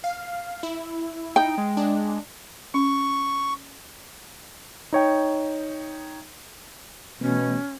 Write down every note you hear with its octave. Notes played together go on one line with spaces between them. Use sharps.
F5
E4
D#4 G5
G#3
D4
C#4 C#6
D#4 C#5 G5
B2 E3 A3 B3 C#4